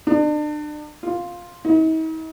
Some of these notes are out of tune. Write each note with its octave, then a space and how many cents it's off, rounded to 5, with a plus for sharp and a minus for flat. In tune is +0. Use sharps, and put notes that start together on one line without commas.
D4 +35
F4 +5
D#4 +45